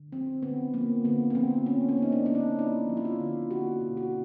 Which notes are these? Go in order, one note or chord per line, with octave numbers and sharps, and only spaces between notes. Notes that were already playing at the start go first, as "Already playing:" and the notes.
Already playing: D3
F3 C4
D3 B3
F3 A#3
D3 B3
B3
F3 C4
A#3 C#4
C#4
A#3
D#4
D4
A#3 D4
D#4
A#3 E4
F3
E4
F4
D3
A#3 F#4
B2
F#4